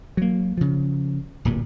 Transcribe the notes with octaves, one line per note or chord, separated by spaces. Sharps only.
F#3 A#3
C#3 F3
D1 G2 A#2